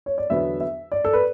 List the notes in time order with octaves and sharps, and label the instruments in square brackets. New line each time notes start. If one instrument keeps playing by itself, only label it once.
[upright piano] C#5
D5
E2 D3 F#3 B3 E5
E5
D5
A4
B4